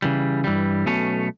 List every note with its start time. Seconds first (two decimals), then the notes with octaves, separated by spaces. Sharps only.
0.02 C#3 E3 G3
0.44 G2 E3 G3
0.86 B1 B2 A3 C#4